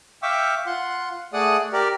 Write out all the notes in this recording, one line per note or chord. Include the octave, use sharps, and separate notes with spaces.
E5 F5 G5 C#6 D6 E6
F4 F#5 C6
A3 G#4 D5 F#5 D#6
G4 A#4 D5